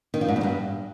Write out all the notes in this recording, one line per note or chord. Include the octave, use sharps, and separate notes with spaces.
D#3
F3
G#2
E2
G2